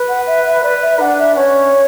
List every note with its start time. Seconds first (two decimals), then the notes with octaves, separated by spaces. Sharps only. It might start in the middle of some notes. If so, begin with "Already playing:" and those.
Already playing: B4
0.08 F#5
0.27 E5
0.45 E5
0.63 B4 D5
0.82 E5
1.00 D4 F#5
1.19 E5
1.37 C#4 C#5